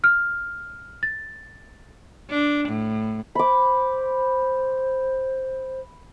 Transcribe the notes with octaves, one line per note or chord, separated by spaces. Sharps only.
F6
A6
D4
A2
C5 B5 D6